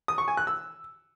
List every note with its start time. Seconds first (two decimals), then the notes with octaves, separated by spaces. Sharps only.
0.08 D#6
0.18 C#6
0.28 G#5
0.37 F#6
0.47 E6